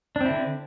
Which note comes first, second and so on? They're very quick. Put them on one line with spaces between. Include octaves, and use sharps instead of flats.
D4 C4 E4 D3